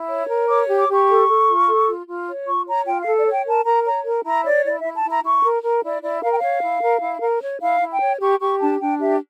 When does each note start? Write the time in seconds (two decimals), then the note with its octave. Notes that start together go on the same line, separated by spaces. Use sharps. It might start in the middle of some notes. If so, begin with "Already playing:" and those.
Already playing: E4
0.08 C#5
0.28 A#4
0.48 C#5 D6
0.68 G4
0.78 D6
0.88 G4
0.93 C#6
1.08 A4
1.28 A4
1.48 F4
1.67 A4
1.88 F4
2.07 F4
2.27 C#5
2.46 F4 C#6
2.66 C#5 A#5
2.86 F4 G5
3.00 F5
3.06 A4
3.16 D5
3.25 C#5
3.31 G5
3.46 A#4 A5
3.65 A#4 A#5
3.85 C#5 A#5
4.05 A#4
4.25 E4 A#5
4.44 C#5 D5
4.65 E4 D5
4.79 E5
4.84 E4
4.95 A5
5.04 E4 A#5
5.24 E4 C#6
5.44 A#4
5.64 A#4
5.83 E4 D5
6.03 E4 D5
6.23 A#4 F5
6.31 G5
6.38 C#5 F5
6.62 E4
6.82 A#4
7.02 E4
7.21 A#4
7.41 C#5
7.61 E4 F5
7.81 E4
7.91 G5
8.01 C#5
8.20 G4 C#6
8.40 G4 C#6
8.60 D4 A5
8.80 D4 G5
8.99 G4 E5